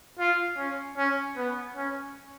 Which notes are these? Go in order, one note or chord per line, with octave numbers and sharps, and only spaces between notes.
F4
C#4
C#4
B3
C#4